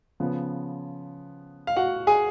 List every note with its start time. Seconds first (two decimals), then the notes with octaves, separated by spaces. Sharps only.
0.20 C#3 F3 B3
1.67 F5
1.76 F#4 F#5
2.07 G#4 G#5